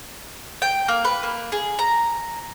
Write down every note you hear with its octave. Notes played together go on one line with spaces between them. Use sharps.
G5
A#3
B4
A#3
G#4
A#5